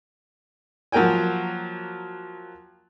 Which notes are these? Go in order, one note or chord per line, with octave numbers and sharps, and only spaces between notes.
F3 F#3 A#3 A#4 G5 G#5